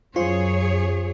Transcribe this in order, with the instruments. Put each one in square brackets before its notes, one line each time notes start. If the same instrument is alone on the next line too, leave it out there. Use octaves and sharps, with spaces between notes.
[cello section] F#2 G#4 C#5 [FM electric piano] F4 C5